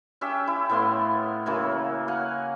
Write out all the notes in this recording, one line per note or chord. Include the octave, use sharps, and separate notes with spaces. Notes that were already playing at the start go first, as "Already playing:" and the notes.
C#4 G4 E5
E4
A2 B3 F5 C6
C#3 E3 F#3 A#3
F5 F#5 G#5